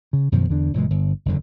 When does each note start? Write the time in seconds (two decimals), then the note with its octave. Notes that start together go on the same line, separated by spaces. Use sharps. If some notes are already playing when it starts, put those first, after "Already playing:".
0.13 C#3
0.32 F#2 B2 D#3 F3
0.49 E2 D3 D4
0.74 F#1 A#2 E3 G#3
0.90 G1
1.26 F#1 E2 D3